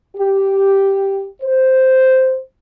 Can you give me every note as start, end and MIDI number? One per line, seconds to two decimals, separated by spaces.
0.16 1.26 67
1.42 2.39 72